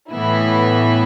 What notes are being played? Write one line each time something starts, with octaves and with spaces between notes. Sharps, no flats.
A2 E3 B3 E4